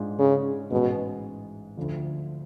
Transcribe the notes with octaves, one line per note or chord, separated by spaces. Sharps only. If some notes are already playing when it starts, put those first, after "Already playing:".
Already playing: G#2 G#3 D4 F4 G#4
C#3
A1 G#2 B2 G#3
D2 D3 F3